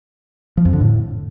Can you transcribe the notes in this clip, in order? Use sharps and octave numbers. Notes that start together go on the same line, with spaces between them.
F3
F2
D3
A2